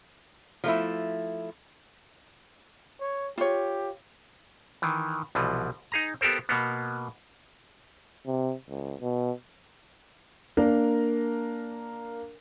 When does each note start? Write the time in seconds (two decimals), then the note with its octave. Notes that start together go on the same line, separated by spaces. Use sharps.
0.64 F3 A3 E4
3.00 C#5
3.38 F4 G4 C#5
4.82 D#3 E3
5.35 C2 B2 E3 F3
5.92 D#4 G#4 A#5
6.21 B3 G4 A4 A#4 C5
6.49 B2 A#3 B3
8.27 C3
8.69 C#2
9.00 B2
10.57 A#3 D4 A#4